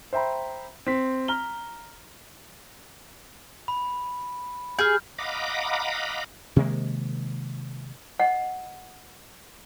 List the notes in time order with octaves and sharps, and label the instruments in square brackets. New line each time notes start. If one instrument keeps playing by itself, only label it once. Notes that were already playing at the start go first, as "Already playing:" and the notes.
[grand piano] C5 E5 G5 A#5 B5
C4 B6
A#5 F6 G7
[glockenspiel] B5
[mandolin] G#4 [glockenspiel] F6 G6
[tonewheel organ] D#5 F5 F#5 A#5 B5 D6
[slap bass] C3 D#3 G#3 A#3
[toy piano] D#5 F#5